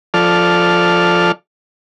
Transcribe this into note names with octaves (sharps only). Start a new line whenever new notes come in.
F3 A4 D5 F6